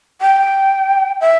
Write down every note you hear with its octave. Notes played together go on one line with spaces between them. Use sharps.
G5
E5